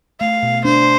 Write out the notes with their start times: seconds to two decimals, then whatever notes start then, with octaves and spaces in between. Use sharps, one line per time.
0.20 A3 F5
0.43 B2
0.65 D4 C5